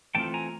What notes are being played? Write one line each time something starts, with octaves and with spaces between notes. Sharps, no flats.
E3 A3 C4 F4 G5 A5
G#5 A#5